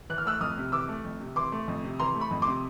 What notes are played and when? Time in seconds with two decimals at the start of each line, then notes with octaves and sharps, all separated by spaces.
0.10 E3 F#6
0.18 F6
0.25 A3 E6 F#6
0.41 F2 D#6 F6
0.57 C3
0.72 E3 D6 E6
0.89 A3
1.04 F2
1.20 C3
1.36 E3 C6 D6
1.52 A3
1.68 F2
1.84 C3
1.99 E3 A#5 C6
2.15 A3
2.21 B5 C#6
2.31 F2
2.42 C6 D6
2.47 C3